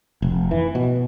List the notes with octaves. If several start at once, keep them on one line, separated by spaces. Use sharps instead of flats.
F1
E3
B2